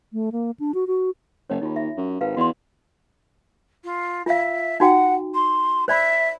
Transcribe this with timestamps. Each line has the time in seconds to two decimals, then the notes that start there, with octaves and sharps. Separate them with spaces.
0.13 A3
0.32 A#3
0.60 D4
0.74 F#4
0.87 F#4
1.50 F#1 C#5 D#5
1.62 D#2 D#4 F4
1.76 E5
1.97 F#2
2.21 G#1 B4 F5
2.37 E2 F#4 D#5 C6
3.83 F4
4.26 F4 E5 F5
4.80 D#4 F#4 F#5 G5
5.34 C6
5.88 C5 D5 E5 B5